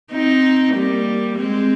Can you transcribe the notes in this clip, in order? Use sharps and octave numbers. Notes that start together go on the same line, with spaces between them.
C4 D#4
G3 A#3
G#3 C4